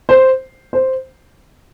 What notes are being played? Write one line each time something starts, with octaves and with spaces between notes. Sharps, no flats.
C5
C5